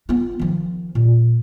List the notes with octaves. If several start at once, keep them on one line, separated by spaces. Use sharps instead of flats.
B3 F4
D#3 F3
A#2